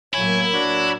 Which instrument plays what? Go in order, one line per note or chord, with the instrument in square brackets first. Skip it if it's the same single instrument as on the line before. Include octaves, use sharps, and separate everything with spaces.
[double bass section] A2 F#3 A#3 [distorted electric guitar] E4 [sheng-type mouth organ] C#5 G#5
[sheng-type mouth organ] D4 F#4 C#5